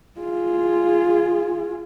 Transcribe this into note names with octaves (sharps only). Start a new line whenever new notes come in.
F4 G#4